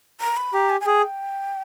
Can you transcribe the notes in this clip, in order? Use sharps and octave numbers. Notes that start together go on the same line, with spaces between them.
A#5
B5
G4 A#5
G#5
G#5
G#4 G5